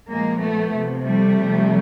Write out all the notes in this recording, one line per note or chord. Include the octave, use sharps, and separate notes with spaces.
A#2 F3 G#3 A#3
A3 B3
C3 F3
G3 A3
C3 F3